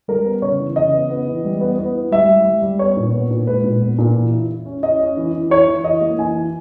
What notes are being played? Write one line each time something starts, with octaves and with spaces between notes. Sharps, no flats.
G3 A#4
B3
C#3 C#5
E3
C#3 D#5
B3
B3
E3
G3
B3
B3
E4
G3 E5
G3
G3
G3
B3 C#5
A#2
B3
A#2
G#3 B4
A#2
B3
A#2
E3
E4
E4
C#4
C#4 D#5
C#4
E3
E3
E4 C#5
E3
E4 D#5
A#3
E3 G#5
E4